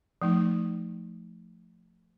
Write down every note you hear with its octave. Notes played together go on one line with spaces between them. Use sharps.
F3 A3 D#4